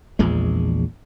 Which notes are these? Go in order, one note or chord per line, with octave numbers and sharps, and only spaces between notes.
A#1 E2 A#2 G#3